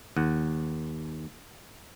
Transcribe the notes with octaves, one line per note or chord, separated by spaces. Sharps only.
D#2 F#5